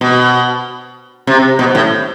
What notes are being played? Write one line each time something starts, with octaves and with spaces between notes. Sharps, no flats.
B2
C3
B2
A2